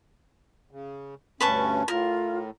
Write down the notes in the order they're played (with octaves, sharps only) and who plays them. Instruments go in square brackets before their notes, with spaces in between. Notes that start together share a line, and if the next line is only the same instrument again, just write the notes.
[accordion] C#3
[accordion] D2 G2 C#4 [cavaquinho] B4 A5 C#6
[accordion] A2 [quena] F4 [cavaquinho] A#4